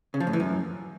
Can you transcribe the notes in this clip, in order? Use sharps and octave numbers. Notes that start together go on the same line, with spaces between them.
C#3
F3
A2
E3
F#2